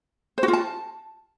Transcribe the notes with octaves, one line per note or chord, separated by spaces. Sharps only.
C5
F#4
F4
A5